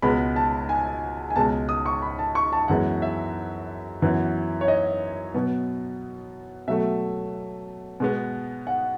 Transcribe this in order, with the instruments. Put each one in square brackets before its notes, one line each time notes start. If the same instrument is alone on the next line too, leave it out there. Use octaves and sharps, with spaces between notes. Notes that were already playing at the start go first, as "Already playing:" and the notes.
[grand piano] C#2 B2 G#3 B3 B5
A5
G#5
G#5
C#2 B2 G#3 A5
D#6
C#6
B5
A5
C#6
A5
F#2 E3 G#3 B3 F#5
E5
F#2 E3 B3
C#5
D#5
B2 F#3 B3
B2 F#3 A3 E5
B2 G#3 B3
F#5